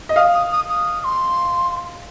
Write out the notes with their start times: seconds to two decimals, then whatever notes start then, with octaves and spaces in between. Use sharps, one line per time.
0.09 D#5
0.16 F5 D#6
0.34 D#6
0.52 D#6
0.69 D#6
1.01 D#6
1.04 C6